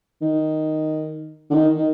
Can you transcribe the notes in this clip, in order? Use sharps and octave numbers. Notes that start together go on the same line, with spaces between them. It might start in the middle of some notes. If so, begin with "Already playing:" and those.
D#3
D3
D#3
D#3